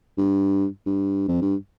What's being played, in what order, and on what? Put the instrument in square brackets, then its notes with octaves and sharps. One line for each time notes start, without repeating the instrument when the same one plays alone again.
[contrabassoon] G2
G2
F2
G2